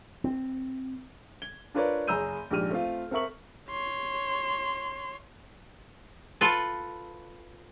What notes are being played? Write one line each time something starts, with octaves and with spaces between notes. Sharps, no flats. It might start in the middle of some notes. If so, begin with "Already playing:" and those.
C4
G#6 G7
D4 F4 A#4 B4 C#5 D5
F#1 G#4 A#5 E6 G6 D#7
A#1 G#2 D4 G4 F6 D#7
A3 C4 F4
C4 A4 A#4 E5 C#6 F#7
C#5 C6
F4 A4 B4